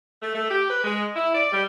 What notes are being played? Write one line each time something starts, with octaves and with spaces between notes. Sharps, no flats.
A3
A3
G4
B4
G#3
E4
D5
G3